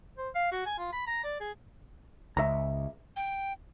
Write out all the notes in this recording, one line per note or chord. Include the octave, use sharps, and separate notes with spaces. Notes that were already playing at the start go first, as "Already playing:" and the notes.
C5
F5
F#4
G#5
F4
B5
A#5
D5
G#4
C#2 E5 A#5
G5